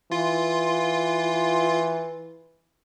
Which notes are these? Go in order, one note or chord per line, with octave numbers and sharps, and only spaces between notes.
E3 F4